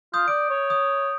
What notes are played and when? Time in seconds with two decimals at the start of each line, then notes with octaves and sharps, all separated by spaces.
0.14 F4 D#6 G6
0.28 D5 D7
0.50 C#5
0.70 D#6